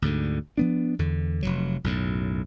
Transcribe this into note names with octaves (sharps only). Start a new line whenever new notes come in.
D2 G#2 D3
F3 B3 D4
E2 D3
F1 C#2 F#3
B1 F#2 A2